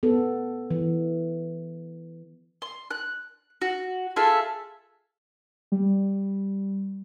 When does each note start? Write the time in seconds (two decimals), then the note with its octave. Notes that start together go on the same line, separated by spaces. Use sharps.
0.03 B3 A4
0.71 E3
2.62 C6
2.91 F#6
3.62 F#4
4.16 F4 G#4 A4 E5
5.72 G3